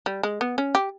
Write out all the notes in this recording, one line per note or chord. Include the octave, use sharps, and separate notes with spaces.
G3
G#3
B3
C#4
G4